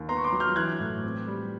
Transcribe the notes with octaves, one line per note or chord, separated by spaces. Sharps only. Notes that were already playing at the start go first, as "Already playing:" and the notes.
Already playing: D#2
B3 A#5 C6
C#6
C6 D6
F#3
F6 G6
E3 F#6 G#6
A2
C4
G3